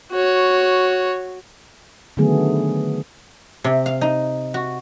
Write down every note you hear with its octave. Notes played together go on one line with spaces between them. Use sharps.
F#4 C#5
D3 D#3 F#3 A3 B3 G#4
C3
F5
D#4
F#4